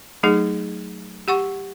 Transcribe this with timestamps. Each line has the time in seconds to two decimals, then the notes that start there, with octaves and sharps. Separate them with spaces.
0.23 F#3 A3 D#4 G#4
1.28 G4 F#5 C#6